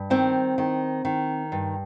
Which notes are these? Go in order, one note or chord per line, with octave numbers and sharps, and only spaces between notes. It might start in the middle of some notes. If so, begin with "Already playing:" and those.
Already playing: G2
D#3 C4
D#3
D#3
G2